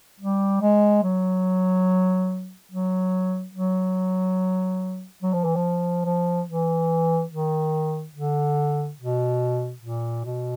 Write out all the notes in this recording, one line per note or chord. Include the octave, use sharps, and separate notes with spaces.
G3
G#3
F#3
F#3
F#3
F#3
F3
E3
F3
F3
E3
D#3
D3
B2
A#2
B2